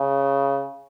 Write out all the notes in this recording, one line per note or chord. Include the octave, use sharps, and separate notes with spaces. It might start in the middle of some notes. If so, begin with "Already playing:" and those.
Already playing: C#3